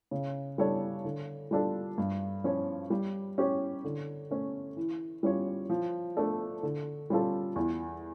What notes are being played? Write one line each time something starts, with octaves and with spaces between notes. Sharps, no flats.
C#3
G3 D4 A4 C#5
D3
G3 D4 F4 A4
G2
F3 C#4 F4 C#5
G3
C#4 G4 C#5
D3
A3 C#4
E3
G3 C#4 F4 C#5
F3
A3 D4 A4 D5
D3
G3 C#4 F4 A4
E2